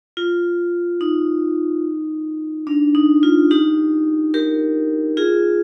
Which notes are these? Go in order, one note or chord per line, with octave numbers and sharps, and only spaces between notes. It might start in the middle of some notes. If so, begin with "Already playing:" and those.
F4
D#4
D4
D#4
F4
D#4 G4
G4 A#4
F4 G#4